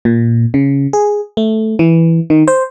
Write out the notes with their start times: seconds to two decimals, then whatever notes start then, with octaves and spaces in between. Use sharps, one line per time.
0.05 A#2
0.54 C#3
0.93 G#4
1.37 A3
1.79 E3
2.30 D#3
2.48 C5